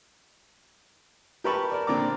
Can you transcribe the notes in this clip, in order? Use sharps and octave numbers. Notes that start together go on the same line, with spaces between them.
G4 A#4 B4 A5 B5 C#6
A#4 D5
A#2 D3 C4 D5 A#5 D6